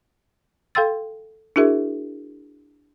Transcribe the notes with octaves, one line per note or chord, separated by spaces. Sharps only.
A4 F5 G5 C6 E6 A6
D4 E4 F#4 G#4 A#4 E5